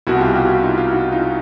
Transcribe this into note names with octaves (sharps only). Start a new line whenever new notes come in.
C2 B2 E4 F#4
F4 G4
F4 G4
E4 F#4
D#4 F4
D#4 F4
E4 F#4
D#4 F4